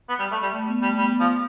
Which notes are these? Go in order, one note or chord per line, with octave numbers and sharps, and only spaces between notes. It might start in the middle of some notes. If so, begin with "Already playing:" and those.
B3
G3
A3
G3
A3
B3
G3 A3
G3 B3
B3
F3